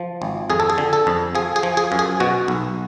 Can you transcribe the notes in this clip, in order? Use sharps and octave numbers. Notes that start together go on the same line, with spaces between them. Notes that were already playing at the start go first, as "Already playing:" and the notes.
Already playing: F3
G#1
F2 G#4
A4
G#4
D3
A4
F2
F3 G#4
G#4
F3
G#4
F#2
G#4
B2 F#4
B1